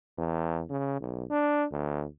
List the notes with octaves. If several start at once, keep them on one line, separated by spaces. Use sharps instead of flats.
E2
C#3
B1
D4
D2